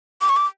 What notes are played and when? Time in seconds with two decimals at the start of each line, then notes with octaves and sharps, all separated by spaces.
0.21 D6
0.29 C#6
0.36 D6